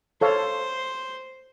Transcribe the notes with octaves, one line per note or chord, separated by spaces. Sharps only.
A4 C5 C#5 F5